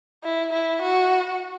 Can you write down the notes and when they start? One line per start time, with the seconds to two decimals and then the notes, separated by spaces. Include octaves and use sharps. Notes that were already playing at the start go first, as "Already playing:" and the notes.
0.24 E4
0.53 E4
0.82 F#4